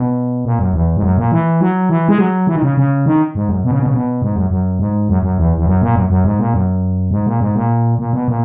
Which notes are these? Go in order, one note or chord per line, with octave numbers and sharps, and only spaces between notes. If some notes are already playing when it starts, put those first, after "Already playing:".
Already playing: B2
A#2
F#2
E2
G#2
F#2
A#2
E3
F#3
E3
G#3
F#3
E3
D#3
C#3
C#3
D#3
G#2
F#2
B2
C#3
B2
C#3
B2
G#2
F#2
F#2
G#2
F#2
F#2
E2
E2
F#2
A#2
F#2
F#2
G#2
A#2
F#2
G#2
A#2
G#2
A#2
A#2
B2
A#2